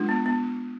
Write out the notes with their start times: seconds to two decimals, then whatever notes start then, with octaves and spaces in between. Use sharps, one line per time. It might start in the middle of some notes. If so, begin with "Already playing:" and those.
Already playing: G#3 D4 F4
0.09 B3
0.26 B3